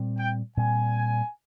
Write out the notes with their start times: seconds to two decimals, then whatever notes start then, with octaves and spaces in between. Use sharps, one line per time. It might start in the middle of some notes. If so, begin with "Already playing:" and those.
Already playing: A#2 G3 C4
0.17 G5
0.57 A#2 G3 C4 G#5